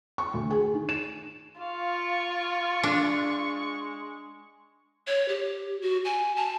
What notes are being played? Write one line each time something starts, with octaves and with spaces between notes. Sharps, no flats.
C#6
D2
G#4
D#3
E7
F4 F5 C#6
G#3 D4
C#5
G4
F#4
G#5
A5